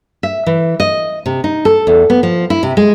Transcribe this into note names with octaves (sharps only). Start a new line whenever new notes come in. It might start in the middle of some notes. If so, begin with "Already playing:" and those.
E5
E3
D#5
C3
D#4
A4
E2
B3
F3
E4
C3
G#3